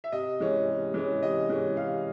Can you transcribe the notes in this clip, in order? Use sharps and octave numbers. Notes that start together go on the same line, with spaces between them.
E5
C3 D#5
E3 G#3 C#4
C3
E3 G#3 C#4
C3 D#5
E3 G#3 C#4
C3 F5